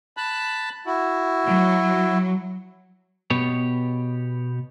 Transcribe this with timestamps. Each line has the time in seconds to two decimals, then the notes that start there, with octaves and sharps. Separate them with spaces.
0.17 A5 B5 F#6
0.86 E4 F#4
1.46 F#3
3.30 B2 B3 G4 C#5